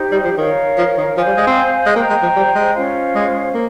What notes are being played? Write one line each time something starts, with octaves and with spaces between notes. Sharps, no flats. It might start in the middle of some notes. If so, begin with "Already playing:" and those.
Already playing: D#4 G4 C5
G3
F3
D#3 A#4 C#5 F5
F3
D#3
F3 C5 F5 G#5
G3
G#3
C4
G#3
A#3 C5 G5 A#5
G#3
F3
G3
G#3
C#4 F4 C5 F5
G#3
A#3